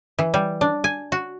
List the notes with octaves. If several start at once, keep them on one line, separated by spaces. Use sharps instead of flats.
E3
G3
D4
G#5
F#4